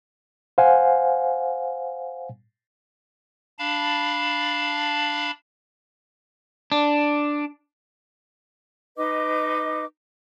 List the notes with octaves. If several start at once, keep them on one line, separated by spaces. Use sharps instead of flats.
C5 F5 F#5 G#5
D4 F5 A5 B5
D4
D#4 B4 D#5 D6